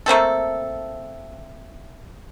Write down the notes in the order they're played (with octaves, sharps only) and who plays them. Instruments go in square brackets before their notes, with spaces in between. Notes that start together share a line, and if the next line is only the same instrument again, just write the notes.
[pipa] A3 A#3 C4 A4